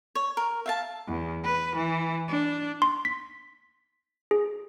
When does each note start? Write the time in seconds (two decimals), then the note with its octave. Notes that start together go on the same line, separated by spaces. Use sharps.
0.15 C#5
0.37 A#4
0.66 E5 F5 A5
1.08 E2
1.44 B4
1.77 E3
2.28 D4
2.82 C6
3.05 B6
4.31 G#4